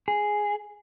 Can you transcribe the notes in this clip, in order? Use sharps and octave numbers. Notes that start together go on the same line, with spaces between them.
G#4